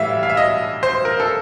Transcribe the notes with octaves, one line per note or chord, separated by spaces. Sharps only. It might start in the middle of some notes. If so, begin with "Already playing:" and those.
Already playing: A2 E3 G3 E5 F5
F5
E5
D#5
C5
A#4
A4